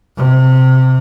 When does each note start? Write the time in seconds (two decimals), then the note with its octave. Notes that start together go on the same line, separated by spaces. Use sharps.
0.17 C3